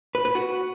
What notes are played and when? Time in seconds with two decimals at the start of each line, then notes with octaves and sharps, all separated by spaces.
0.15 B4
0.25 B4
0.35 F#4